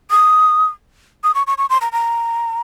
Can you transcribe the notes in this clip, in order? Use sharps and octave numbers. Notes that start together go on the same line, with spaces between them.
D#6
D#6
C#6
C#6
C#6
C6
A#5
A#5